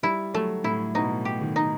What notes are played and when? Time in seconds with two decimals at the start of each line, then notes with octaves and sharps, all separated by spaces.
0.03 G3 E4
0.34 F#3 A3
0.64 A2 E4
0.95 B2 D#4
1.25 G4
1.41 D#3
1.56 D#4